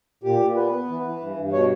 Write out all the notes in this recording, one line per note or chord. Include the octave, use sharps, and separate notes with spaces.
A#2 G4
A#2
B3 B4
B3
E3
E3
G2
G2
B2 C#5